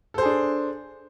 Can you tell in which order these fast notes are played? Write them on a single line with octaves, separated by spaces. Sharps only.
A4 C5 G#4 D4